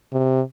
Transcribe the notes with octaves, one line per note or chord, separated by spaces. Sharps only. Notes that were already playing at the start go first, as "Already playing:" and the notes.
C3